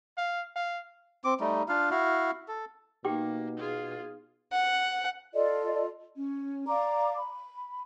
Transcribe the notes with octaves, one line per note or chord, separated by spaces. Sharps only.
F5
F5
C4 D6
G3 A3 D#4
D4 F4 F5
E4 F#4 F5
A4
B2 A#3 D#4 G4 G5 D6
F4 G#4
F#5
F4 A4 D5 D#5
C#4
D5 F5 A#5 D6
B5